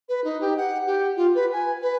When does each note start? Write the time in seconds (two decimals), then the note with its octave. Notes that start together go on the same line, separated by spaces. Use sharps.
0.09 B4
0.24 D#4
0.41 G4
0.57 F#5
0.87 G4
1.17 F4
1.35 B4
1.53 G#5
1.82 B4